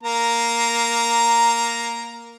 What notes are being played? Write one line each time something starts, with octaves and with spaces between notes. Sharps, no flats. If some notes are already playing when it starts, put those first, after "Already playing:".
A#3 A#5